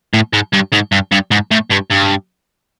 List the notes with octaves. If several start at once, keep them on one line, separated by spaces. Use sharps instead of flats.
A2
G#2
G2
G#2
G2
G2
G#2
A2
G2
G2